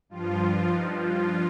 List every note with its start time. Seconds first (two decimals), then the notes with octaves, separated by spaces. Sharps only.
0.09 G2 F3 F4
0.71 G2 F3 D#4
1.02 F4